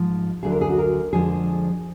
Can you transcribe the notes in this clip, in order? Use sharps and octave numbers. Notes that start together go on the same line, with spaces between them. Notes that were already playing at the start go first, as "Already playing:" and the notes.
Already playing: G#2 F3 G#3
D2 D3 F#3 G#4
A#4
G#4
F#4
A#4
F2 D3 F3 G#3 G#4